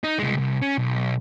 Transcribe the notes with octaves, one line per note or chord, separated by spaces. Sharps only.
D#4
C2 G#3
C2
C#4
B1